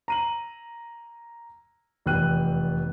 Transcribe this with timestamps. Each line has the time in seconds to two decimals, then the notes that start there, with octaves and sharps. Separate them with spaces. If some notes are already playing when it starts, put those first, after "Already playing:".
0.08 A#5 D#7 F#7
2.06 F1 E2 G5 F#6 D#7